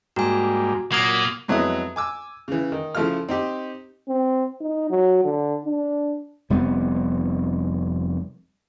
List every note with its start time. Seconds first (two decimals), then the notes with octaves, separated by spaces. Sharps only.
0.16 G#2 G3 A#3 F#4 G#5
0.92 A#2 F#3 A#3 D#6 G#6
1.48 F2 F#3 G#3 B3 E4 D#6
1.96 G#5 D6 E6
2.48 C#3 E3
2.72 D#3
2.95 C#3 F3 A3 E4 F4 F6
3.29 C4 D#4 G4
4.08 C4
4.61 D#4
4.90 F#3
5.25 D3
5.65 D4
6.50 F1 G3 B3 C4